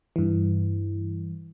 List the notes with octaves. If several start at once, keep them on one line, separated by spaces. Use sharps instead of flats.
G2 E3